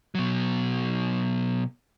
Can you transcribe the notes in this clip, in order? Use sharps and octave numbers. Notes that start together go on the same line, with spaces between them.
B2 F#3